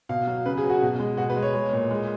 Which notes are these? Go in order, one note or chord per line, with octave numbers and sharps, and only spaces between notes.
B2 F5
F#3
C#3 B4
G#4
F#3
F#4
B2
G#3
B2 F#4
B4
G#3
C#5
G#3
A#2
G#3